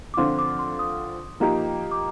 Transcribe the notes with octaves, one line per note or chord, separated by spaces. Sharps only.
D6
D3 F3 C4 F4 C6
D6
C6
D#6
F3 A#3 D#4 G4
D6